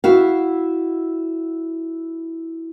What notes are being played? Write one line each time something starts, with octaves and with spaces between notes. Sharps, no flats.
E4 F#4 F5